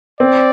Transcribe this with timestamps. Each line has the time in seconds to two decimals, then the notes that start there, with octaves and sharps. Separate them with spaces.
0.20 C4 D5